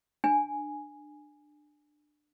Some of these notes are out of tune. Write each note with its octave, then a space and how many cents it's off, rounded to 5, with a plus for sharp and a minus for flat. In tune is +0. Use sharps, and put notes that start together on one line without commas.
D4 +20 G#5 +0